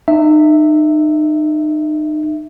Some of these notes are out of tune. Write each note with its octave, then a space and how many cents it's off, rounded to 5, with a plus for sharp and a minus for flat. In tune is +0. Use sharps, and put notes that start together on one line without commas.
D#4 -35 E5 +0